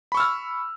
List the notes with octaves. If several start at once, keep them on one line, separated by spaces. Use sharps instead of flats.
B5 C#6 E6 F6